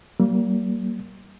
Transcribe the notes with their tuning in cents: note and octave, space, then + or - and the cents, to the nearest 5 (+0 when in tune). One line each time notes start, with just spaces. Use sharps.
G3 -40 A#3 +0